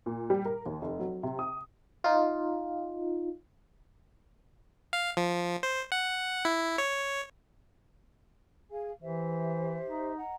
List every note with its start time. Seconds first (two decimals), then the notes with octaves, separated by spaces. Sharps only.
0.06 A#2
0.30 G3
0.45 A#4
0.66 D#2
0.82 F1
0.99 F#3
1.23 C3
1.39 D#6
2.04 D#4 F4
4.93 F5
5.17 F3
5.63 C5
5.92 F#5
6.45 E4
6.78 C#5
8.71 G#4 F5 G#5
9.02 E3 G4 C5 E5
9.88 D#4
10.16 D#5 F#5 A#5